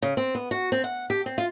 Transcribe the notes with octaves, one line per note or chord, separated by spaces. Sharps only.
C#3
C4
B3
F#4
C4
F#5
G4
C4
F4